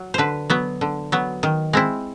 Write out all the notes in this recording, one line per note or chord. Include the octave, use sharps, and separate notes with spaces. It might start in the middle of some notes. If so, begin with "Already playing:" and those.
Already playing: F#3
D3 B4 C5
F#3 B3
D3
F#3 B3
D#3
G#3 C4 E4